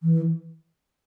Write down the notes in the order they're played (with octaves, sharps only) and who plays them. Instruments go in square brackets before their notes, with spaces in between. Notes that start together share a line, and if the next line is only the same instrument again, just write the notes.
[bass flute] E3